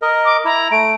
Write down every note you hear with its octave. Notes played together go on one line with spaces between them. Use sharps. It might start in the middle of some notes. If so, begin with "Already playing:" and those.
A#4 D#5
D6
E4 A#5
A3 D7